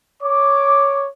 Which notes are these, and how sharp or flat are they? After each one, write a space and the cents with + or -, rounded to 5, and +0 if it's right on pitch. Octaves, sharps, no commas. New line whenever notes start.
C#5 +0 D6 +0